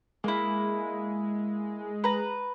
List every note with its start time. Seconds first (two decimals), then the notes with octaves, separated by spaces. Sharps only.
0.24 G#3 A#3 E4
2.04 B4 A#5